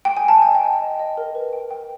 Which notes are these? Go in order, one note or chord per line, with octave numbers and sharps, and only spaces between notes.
G5
G#5
G5 A5
D#5 G#5
G5
D#5
D#5
D#5
A#4
B4
G5
G5